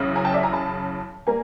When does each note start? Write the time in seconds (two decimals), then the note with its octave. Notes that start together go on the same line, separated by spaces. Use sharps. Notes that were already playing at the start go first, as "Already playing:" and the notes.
Already playing: F#2 C#3 E3
0.15 G#5 A#5
0.25 G5 A5
0.34 D5 E5
0.43 G#5 A#5
0.52 A5 B5
1.27 G3 A#3 G#5 A#5